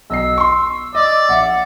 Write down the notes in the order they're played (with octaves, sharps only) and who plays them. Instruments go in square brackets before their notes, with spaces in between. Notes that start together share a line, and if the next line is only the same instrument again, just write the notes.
[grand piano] B1 D#5 C7 [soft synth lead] E6
[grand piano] C6 C#6
[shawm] D5 [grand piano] D#5
[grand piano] A#1 E5 [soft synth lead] F#5